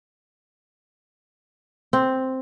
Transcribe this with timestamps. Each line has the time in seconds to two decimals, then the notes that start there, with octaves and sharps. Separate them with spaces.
1.93 C4